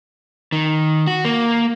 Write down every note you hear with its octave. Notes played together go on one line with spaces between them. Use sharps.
D#3
F#4
A#3